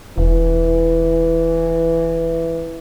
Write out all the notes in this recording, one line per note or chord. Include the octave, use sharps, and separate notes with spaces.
E1 E3